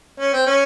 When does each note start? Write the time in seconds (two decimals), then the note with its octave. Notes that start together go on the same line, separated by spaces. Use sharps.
0.19 C#4
0.33 C4
0.47 C#4